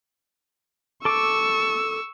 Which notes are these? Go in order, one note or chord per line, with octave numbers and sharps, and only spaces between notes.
A4 C#6 D6 E6